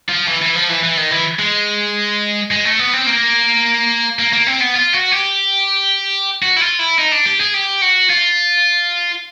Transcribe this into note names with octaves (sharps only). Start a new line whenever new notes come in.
F3
E3
E3
F3
E3
E3
D#3
E3
G#3
G#3
A3
B3
C4
A#3
A#3
A#3
C4
B3
F4
F#4
G4
F#4
E4
F4
E4
D#4
D4
G4
G#4
G4
F#4
F4